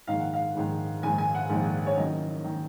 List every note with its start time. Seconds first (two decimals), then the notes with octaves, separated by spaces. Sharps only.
0.07 A#1 G#2 D#3 F5
0.20 F#5
0.33 F5
0.55 A#1 G#2 D#3
1.02 A#1 G#2 D#3 G#5
1.18 G#5
1.35 F#5
1.50 A#1 G#2 D#3
1.87 C#5
1.97 F#1 F#2 D#3 D#5
2.44 D#3